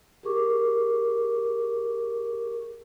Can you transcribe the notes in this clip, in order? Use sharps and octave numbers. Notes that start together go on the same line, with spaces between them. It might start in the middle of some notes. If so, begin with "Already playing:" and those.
G4 G#4 A#4 C#6 D6